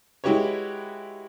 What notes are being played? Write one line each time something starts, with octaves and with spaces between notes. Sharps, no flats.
G#3 E4 F#4 G4 B4 C#5